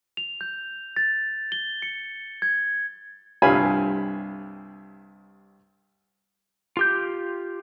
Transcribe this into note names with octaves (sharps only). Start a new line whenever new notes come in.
F7
G6
A6
G7
C#7
G#6
C2 G2 F4 G#5 B5
F4 G4 G6